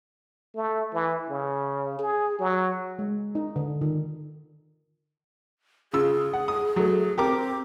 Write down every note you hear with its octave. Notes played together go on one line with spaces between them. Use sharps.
A3
E3
C#3
G#4
F#3
G#3
D#4
D3
D#3
C#3 F4 G#4 E6
F#5
D#6
F#3 A3
C4 G4 A#4 D6